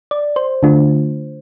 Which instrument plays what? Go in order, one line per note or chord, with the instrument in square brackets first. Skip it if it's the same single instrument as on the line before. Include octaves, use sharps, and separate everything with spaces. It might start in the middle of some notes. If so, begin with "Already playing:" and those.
[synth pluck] D5
C5
D3 A3 D4 F4